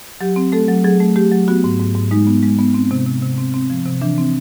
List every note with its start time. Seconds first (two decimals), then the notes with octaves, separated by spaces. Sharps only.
0.21 F#3 G4
0.36 C4
0.52 A3 A4
0.68 F#3
0.84 F#3 G#4
1.00 A3
1.16 A3 G4
1.32 F#3
1.48 B3 F#4
1.64 G#2
1.80 G#2
1.95 G#2
2.11 G#3 D#4
2.27 B3
2.43 G#3
2.59 B3
2.74 C4
2.91 C3
3.06 C3
3.22 C3
3.38 C4
3.54 C4
3.70 F3
3.86 C3
4.01 E3 D4
4.18 C4